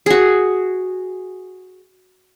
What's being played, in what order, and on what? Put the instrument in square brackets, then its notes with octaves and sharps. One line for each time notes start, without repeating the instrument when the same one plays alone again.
[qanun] F#4 G#4